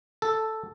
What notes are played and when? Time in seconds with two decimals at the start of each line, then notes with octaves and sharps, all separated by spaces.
0.22 A4